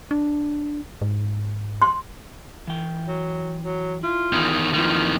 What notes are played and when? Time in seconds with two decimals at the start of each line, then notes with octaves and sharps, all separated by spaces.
0.11 D4
1.02 G#2
1.82 C6
2.67 E3 G5
3.07 F#3
3.64 F#3
4.03 E4 F4
4.33 E2 D#3
4.73 F2 A#2 D#3 E3 A3 F4